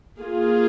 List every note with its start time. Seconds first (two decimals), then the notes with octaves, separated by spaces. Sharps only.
0.21 A#3 F4 G#4